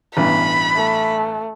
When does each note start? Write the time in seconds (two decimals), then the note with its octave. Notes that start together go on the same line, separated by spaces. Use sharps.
0.17 A1 G2 B2 B5
0.75 A3